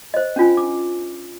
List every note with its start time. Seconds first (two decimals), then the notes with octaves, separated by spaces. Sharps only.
0.14 C5 D#5
0.36 C#4 D4 F4 G#5
0.57 D6